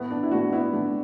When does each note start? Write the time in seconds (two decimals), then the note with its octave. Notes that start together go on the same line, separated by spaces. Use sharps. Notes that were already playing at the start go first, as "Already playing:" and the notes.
Already playing: A2 A3 B3
0.11 D4
0.23 E4
0.31 A2 A3 D4 F#4
0.52 B3 E4
0.73 A2 A3 D4